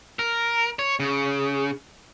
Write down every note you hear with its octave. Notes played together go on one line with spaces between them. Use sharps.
A#4
C#5
C#3